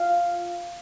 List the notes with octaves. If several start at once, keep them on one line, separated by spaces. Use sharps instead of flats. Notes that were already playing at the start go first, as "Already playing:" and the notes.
Already playing: F4 F5